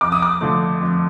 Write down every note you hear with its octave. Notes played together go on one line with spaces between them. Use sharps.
F2 D6
D#6
D6
D3 F3 A3
F2